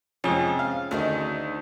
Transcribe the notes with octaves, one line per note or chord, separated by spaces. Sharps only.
F2 G#2 C3 C#4 G#4
F5
D2 D3 D#3 D#4